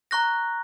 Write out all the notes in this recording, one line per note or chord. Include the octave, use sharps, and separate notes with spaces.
A#5 C#6 F#6 A#6